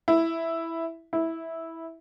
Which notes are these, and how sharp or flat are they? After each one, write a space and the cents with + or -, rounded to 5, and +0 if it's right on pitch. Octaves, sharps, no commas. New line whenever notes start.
E4 +0
E4 -10